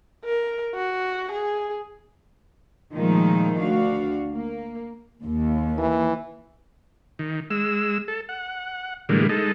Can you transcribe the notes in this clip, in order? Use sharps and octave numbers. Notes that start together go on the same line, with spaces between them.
A#4
F#4
G#4
A#2 D#3 F3 G#3 A3 D#4
D2 D4 F#4 F5
A#3
D#2
E3
D#3
G#3 E6
A4
F#5
A2 D3 E3 G3 G#3 A#3
G#3 D#4 A4